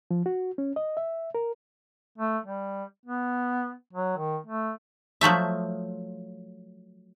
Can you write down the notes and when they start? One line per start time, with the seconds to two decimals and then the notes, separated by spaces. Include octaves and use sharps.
0.11 F3
0.26 F#4
0.58 C#4
0.76 D#5
0.97 E5
1.35 A#4
2.18 A3
2.46 G3
3.06 B3
3.93 F#3
4.17 D#3
4.47 A3
5.21 F3 F#3 A3 E5